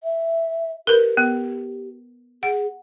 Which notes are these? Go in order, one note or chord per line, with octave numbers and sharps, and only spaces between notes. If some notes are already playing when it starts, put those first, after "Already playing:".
E5
G4 A#4 B4
B3
G#4 F#5